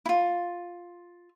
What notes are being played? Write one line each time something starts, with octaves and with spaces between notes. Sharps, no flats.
E4 F4